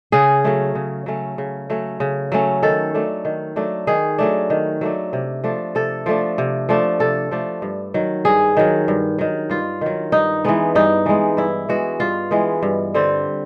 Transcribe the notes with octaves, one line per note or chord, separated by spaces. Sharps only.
C#3 G#4
F#3 A3 C#4
C#3
F#3 A3 C#4
C#3
F#3 A3 C#4
C#3
F#3 A3 C#4
D#3 A4
F#3 A3 D4
D#3
F#3 A3 D4
D#3 G#4
F#3 A3 D4
D#3
F#3 A3 D4
C3
F3 A3 D4
C3 A4
F3 A3 D4
C3
F3 A3 D4
C3 A4
F3 A3 D4
G2
D#3 F#3
G2 G#4
D#3 F#3
G2
D#3 F#3
G2 F4
D#3 F#3
G2 D#4
E3 G#3 B3
G2 D#4
E3 G#3 B3
G2 E4
E3 G#3 B3 F#4
G2 F4
E3 G#3 B3
G2
D3 G3 C4